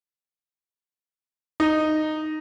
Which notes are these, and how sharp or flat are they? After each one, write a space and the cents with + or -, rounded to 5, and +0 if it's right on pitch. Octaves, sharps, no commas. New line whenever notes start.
D#4 -10